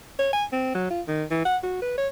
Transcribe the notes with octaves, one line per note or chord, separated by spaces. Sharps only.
C#5
G#5
C4
F#3
F4
D#3
E3
F#5
F#4
B4
C#5